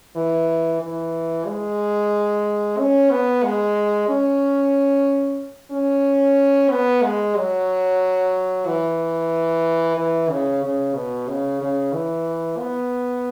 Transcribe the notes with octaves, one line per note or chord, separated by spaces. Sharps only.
E3
E3
G#3
C#4
B3
G#3
C#4
C#4
B3
G#3
F#3
E3
E3
C#3
C#3
B2
C#3
C#3
E3
B3